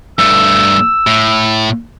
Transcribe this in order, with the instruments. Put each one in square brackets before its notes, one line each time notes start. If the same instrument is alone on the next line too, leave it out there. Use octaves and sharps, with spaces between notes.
[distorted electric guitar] G2 A3 [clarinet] E6
[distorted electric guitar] A2